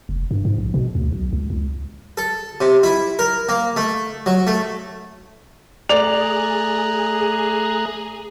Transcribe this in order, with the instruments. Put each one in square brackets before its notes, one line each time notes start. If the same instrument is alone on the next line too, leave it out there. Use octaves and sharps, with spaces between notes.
[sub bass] F1
G2
G#2
A#1
B2
D2
B1
C#2
C#2
[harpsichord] A4
C3
E4
A#4
A#3
A3
F#3
A3
[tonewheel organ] A3 A#5 F#6 [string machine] G#4 [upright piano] D5 F7